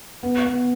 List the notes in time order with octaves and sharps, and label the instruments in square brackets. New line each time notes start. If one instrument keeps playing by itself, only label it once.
[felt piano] B3
B3